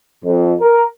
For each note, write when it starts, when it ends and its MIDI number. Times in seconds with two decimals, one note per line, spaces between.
0.24 0.54 41
0.61 0.83 70